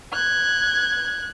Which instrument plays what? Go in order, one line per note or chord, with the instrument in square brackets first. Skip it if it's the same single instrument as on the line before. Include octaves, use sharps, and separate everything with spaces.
[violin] F#6 G#6